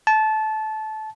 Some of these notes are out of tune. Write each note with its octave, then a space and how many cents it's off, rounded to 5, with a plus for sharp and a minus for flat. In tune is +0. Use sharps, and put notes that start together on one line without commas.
A5 -20